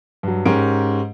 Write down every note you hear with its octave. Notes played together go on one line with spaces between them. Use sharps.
G2 F#3
G#2 C#4 G4 A#4 D7